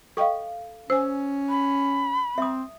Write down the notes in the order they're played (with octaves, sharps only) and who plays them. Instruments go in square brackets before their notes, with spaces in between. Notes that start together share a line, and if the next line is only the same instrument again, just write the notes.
[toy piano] A4 F5 [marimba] D#5 G5 C#6
[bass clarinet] C#4 [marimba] C5 G#5 [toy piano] E6
[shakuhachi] B5
[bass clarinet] C4 [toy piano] E5 D#6